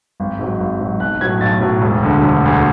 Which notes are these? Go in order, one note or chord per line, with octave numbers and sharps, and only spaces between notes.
G#1
G#2 F#3
G#1
G#2 F#3
B1 F#6
A2 F#3 G#6
B1 A6
A2 F#3
E1
D2 D3
E1
D2 D3